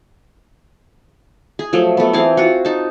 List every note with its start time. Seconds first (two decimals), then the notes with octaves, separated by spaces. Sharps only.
1.59 G#4
1.73 F3 F#3 A3
1.97 A3 B3
2.13 E3 C4 G#4 F5
2.37 F4 F#4
2.65 D#4 A5